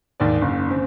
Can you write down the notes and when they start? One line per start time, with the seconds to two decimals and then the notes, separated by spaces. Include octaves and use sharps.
0.20 D#2 G#2 D5
0.42 F#1
0.71 C#3 C4